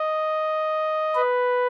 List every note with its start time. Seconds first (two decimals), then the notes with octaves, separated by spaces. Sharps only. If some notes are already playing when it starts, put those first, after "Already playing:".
Already playing: D#5
1.15 B4